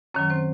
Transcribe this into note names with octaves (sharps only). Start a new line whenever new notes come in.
F#2 D#3 F#3 C#4 C#5
C4 C5